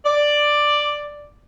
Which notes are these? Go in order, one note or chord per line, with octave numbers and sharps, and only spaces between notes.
D5